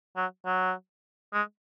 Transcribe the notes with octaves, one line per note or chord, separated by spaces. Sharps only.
F#3
F#3
G#3